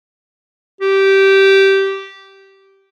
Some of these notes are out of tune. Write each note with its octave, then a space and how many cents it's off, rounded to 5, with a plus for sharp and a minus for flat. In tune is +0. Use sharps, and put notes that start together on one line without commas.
G4 -15